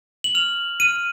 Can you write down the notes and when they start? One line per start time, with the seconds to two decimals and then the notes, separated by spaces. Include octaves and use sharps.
0.24 F#7
0.35 F6 F7
0.80 F6 D#7